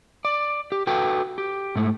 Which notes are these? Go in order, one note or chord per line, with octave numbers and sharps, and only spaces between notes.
D5
G4
F#4 A4 B4 G5
G4
G#2 A3